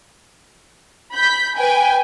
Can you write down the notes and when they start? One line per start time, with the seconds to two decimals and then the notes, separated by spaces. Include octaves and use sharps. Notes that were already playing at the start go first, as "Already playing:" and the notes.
1.14 B5 G6 B6
1.56 B4 G5 G#5